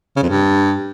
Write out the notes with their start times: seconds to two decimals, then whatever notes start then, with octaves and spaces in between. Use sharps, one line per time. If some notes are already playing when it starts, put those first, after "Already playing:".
0.16 C#3
0.23 F2
0.29 G2